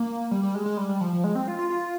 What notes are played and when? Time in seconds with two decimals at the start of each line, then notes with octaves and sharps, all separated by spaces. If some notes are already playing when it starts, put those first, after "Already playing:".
Already playing: A#3
0.31 G3
0.43 G3
0.55 G#3
0.66 G#3
0.77 G3
0.89 G3
1.01 F3
1.13 F3
1.24 G#3
1.35 C4
1.48 F4
1.59 F4
1.70 F4